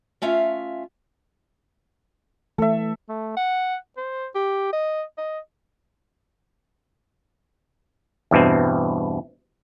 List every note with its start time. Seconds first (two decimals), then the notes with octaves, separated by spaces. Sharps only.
0.22 A3 C#4 F4 E5 F5
2.58 E3 A3 A4 E5
3.09 A3
3.37 F#5
3.97 C5
4.35 G4
4.73 D#5
5.18 D#5
8.31 E2 G2 B2 C4